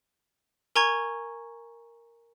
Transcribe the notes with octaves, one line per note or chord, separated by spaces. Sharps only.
A#4 G#5 A#5 C#6 G#6